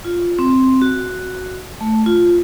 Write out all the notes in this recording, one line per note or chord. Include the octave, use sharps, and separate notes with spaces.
F4
C4
F#4
A3
F4